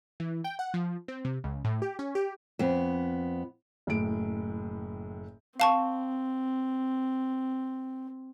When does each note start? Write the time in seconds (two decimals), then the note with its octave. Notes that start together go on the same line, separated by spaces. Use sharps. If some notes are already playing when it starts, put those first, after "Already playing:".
0.20 E3
0.44 G5
0.59 F#5
0.74 F3
1.08 C4
1.25 C3
1.44 C#2
1.65 A2
1.82 G4
1.99 C#4
2.15 G4
2.59 F2 B3
3.87 F#1 A2 D7
5.60 C4 F5 A5 C#6